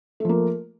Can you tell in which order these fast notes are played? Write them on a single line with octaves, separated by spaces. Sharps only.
A3 F3 A#3